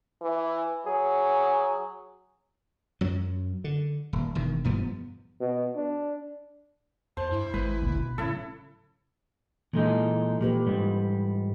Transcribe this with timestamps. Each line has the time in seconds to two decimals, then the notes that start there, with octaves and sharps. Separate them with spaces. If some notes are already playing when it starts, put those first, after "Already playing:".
0.22 E3
0.86 F#3 G#4
3.01 F#2 F#3
3.64 D3
4.13 D#1
4.35 E1 D#3
4.64 E1 G2 F3 B3
5.40 B2
5.76 D4
7.17 E2 C5 A5
7.31 G2 E4
7.54 G#1 G#3 B4
7.80 F1 D2 A#2
7.97 B2
8.18 A2 C#3 F#3 E4 A4
9.73 A#2 E3 F#3 G#3 D#4 A4
10.41 A#2 F3 G4 B4
10.66 G#2 G3